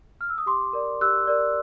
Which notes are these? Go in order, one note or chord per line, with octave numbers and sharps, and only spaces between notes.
F6
E6
D#6
G4 C6 D6
A#4 D5
G4 E6 F#6
A#4 D5